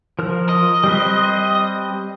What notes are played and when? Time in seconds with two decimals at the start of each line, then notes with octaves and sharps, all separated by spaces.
0.19 F3 A#4 F6
0.49 D#5
0.84 G3 C4 B4